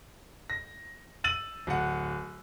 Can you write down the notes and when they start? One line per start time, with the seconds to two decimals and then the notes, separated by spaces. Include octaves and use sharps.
0.50 A#6
1.24 E6 A6 D#7 F#7
1.67 D1 F#5